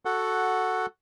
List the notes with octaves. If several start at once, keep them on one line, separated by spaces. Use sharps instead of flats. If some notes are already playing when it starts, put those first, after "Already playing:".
F#4 A4 F#5